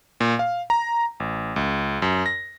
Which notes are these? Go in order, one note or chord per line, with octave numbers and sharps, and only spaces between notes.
A#2
F5
A#5
A1
C#2
F#2
A#6